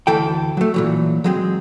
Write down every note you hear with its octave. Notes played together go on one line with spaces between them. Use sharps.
D2 E3 A4 G5
F#3 A3
A#2 E3 F#3
F#3 G#3 C4